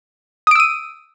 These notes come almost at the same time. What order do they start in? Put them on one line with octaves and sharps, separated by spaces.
D#6 D7 E6 D#7